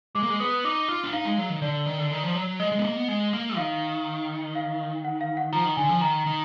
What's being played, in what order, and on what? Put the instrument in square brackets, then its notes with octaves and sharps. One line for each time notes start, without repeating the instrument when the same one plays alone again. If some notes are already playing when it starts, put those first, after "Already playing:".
[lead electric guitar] G#3 [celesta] D6
[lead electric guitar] A#3
G#3
[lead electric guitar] B3 [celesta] D#6
[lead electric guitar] D#4 [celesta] D6
[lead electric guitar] F4
D4
[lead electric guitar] D#4 [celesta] F5
[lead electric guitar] G#3
F#3
D#3
[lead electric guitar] D3 [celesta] D5
[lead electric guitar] D#3
D3
D#3
F3
F#3
[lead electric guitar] G#3 [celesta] D#5
[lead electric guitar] G#3
B3
A#3
B3
G#3
A#3
[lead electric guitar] D#3 [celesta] F5
[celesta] F5
F#5
F5
F#5
[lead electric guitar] F3 [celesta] A#5
[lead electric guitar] D#3
[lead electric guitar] D3 [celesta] G#5
[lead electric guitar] F3
[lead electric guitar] D#3 [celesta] A#5
[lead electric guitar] D#3